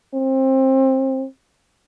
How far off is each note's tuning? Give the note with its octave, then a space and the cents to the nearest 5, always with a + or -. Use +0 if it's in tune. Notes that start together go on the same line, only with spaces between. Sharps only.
C4 +25